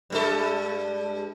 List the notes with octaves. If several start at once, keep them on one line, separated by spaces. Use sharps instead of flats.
G2 G#3 A4